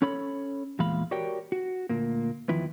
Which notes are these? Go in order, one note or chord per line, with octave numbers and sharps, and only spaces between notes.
C#4 A4 C#5 B5
E2 A#2 E3 G#3 F5 B5
F#4 G4 A#4 C#5 D5 G5
F#4
D2 A#2 A#3
E2 D#3 F3 E4 B4